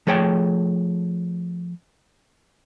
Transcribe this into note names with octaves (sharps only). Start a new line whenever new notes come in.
F3 A3 G#4 C#5 G5 A5